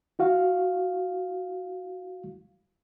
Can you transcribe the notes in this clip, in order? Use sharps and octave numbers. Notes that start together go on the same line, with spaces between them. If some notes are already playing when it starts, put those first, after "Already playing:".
E4 F#4 F5